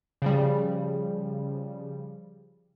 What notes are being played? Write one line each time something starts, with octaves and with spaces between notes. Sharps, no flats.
C#3 F3 G3